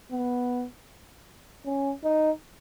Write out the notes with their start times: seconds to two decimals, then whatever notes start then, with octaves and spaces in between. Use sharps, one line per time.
0.12 B3
1.66 C#4
2.04 D#4